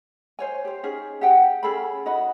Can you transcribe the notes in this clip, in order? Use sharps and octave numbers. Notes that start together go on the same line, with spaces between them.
C5 C#5 G#5
G4 C5
C#4 D#4 G#4
G4 G#4 F#5 G5
C#4 G#4 A4 B5
D#4 F#4 D#5 B5